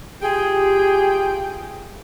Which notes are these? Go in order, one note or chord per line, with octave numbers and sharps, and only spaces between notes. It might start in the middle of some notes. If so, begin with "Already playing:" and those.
F4 G4 G#4 G5